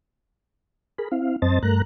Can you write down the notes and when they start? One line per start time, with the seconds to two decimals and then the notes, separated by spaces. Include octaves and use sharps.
0.98 G#4 A#4 B5
1.11 C4 E4 F5
1.42 F#2 C4 C5 D#5 A5 A6
1.63 G2 A3 A#4 A#5 F#6